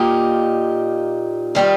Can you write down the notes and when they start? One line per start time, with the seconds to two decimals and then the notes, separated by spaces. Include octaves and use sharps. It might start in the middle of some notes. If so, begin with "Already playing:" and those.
Already playing: A#2 A#3 D#4 G4
1.55 D#3 G3 C4 F4